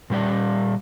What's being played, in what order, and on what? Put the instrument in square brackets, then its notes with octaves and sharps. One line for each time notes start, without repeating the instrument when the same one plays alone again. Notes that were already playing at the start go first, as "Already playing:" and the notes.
[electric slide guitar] A#2 G3 G4 D5